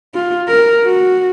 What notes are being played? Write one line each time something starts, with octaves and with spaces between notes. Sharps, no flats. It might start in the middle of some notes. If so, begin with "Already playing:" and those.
F4
A#4
F#4